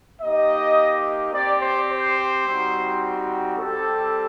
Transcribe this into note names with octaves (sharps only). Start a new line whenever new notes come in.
A#3 D#4 G4 D#5
C4 G4 D5
C5
C5
G3 C4 D#4 F#4
G3 C4 G4 A4